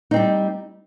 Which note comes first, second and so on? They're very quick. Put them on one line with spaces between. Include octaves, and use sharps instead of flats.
D#4 C4 G3